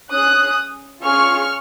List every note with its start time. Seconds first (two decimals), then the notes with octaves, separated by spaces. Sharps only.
0.11 C#4 G#4 D#6 F#6
1.03 C#4 F4 G#4 C#6 F6